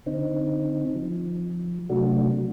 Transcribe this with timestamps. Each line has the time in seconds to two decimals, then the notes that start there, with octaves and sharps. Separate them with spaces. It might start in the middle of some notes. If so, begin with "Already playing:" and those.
0.06 D3 C4 D#4
0.96 F3
1.89 C3 F#3 A3 D4 F#4